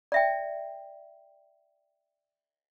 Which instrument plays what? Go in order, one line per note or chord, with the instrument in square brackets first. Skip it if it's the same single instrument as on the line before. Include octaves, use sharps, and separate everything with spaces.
[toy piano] D5 E5 G5